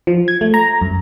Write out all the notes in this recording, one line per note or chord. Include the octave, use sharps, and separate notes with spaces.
F3
G#6
A3
A#5
F#2